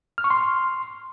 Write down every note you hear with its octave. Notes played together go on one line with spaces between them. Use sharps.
F6
C#6
C6